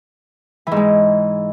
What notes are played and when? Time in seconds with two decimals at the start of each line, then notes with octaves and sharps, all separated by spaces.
0.67 E3
0.72 G#2
0.76 G#3